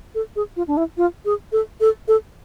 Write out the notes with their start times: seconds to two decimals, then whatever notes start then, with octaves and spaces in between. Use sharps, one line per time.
0.15 A4
0.36 G#4
0.56 F4
0.68 D4
0.77 E4
0.97 F4
1.25 G#4
1.52 A4
1.81 A4
2.08 A4